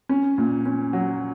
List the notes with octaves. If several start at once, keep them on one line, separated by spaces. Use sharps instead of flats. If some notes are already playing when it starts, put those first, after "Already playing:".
C#4
A#2
C#4
F#3